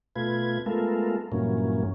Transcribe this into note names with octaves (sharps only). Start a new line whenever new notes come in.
B2 A3 F4 B4 G#6
G#3 A3 B3 F4 A4 A#4
G2 A#2 E3 F#3 A#3 C#4